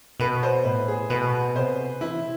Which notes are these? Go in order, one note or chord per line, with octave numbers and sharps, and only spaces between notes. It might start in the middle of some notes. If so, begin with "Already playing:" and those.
B2 B4
C5
A2 B4
G#4
B2 B4
C3 C5
E3 E4